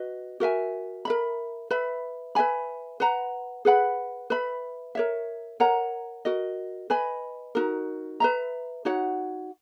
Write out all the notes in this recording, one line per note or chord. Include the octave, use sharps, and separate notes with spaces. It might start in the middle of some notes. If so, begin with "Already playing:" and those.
Already playing: F#4 B4 D#5
F#4 A#4 E5 G#5
A#4 E5 B5
B4 E5 B5
B4 E5 G#5 B5
B4 F#5 A#5
G#4 B4 F#5 B5
B4 E5 B5
A#4 C#5 E5
A#4 C#5 F#5 A#5
F#4 A#4 D#5
B4 D#5 G#5 B5
D#4 F#4 A#4
B4 E5 A#5
D#4 F#4 C#5 F#5